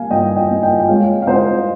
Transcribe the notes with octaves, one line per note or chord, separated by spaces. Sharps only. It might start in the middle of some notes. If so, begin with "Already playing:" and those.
Already playing: G3 A#3 F5 G#5
G2 D#5 G5
D#5 G5
A#3
D#5 G5
G5
G#3 C#5 F5
F5
G#3 C5 D#5